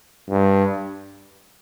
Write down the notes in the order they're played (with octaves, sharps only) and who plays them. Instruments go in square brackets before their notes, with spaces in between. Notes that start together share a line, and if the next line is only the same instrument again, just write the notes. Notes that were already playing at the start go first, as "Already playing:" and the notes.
[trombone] G2